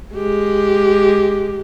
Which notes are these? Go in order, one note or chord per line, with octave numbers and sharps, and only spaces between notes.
G#3 G4